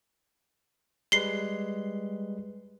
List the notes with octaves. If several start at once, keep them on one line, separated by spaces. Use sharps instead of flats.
G3 G#3 B4 C7 G7